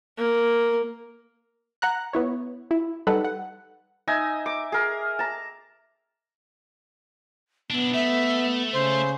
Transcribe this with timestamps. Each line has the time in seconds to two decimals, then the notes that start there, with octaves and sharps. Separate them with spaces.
0.18 A#3
1.82 F#5 A#5 F#6
2.13 B3 E4 C#5
2.71 E4
3.07 G3 D#4 A4 B4 F#5
3.24 F#5
4.07 D#4 D#5 E5 G#5
4.46 D6
4.72 G#4 A#4
5.19 A5 A#5
7.70 B3 D4 E4
7.94 A3 E5
8.73 C#3 C5